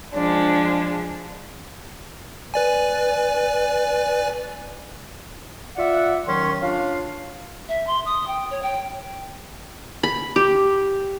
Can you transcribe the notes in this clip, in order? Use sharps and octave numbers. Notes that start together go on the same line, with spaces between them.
F3 G#3 D4
B4 D5 G#5
F4 D5 E5 F#5
D#2 D#3 F#3 C#4 C6
C#4 D4 F4 F5
E5
C6
D#6
G5
C#5
G5
B5
G4